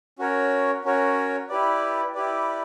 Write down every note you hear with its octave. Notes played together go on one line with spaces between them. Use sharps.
C#4 F#4 A#4 C#5
C#4 F#4 A#4 C#5
E4 G4 B4 D5
E4 G4 B4 D5